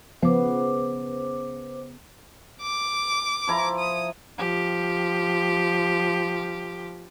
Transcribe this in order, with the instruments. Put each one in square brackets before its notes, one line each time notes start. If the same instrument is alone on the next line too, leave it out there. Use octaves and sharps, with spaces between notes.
[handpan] C#3 B3 [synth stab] F3 [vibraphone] C5 D6
[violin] D6
[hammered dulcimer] F3 E4 A#5
[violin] D#6
[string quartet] F3 G4